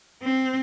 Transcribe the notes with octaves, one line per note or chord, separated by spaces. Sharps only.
C4